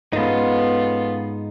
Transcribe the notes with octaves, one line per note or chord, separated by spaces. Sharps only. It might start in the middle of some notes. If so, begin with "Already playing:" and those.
G#2 B3 C#4 D#4 F4 A4 B4